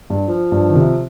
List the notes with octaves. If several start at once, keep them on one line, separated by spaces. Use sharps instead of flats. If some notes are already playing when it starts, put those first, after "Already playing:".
G2
F3
G2
D#3
C3